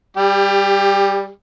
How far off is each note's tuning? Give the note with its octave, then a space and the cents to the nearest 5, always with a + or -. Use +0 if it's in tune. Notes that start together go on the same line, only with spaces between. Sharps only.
G3 +0 G4 +30